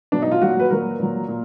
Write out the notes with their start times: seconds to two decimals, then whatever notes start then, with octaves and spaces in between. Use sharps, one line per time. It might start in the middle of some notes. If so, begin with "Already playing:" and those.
0.12 B2 F#3 D4
0.22 D#4
0.32 F4
0.41 A#2 F#3 F#4
0.59 B4
0.70 A#2 F#3 A#4
0.99 A#2 F#3
1.28 A#2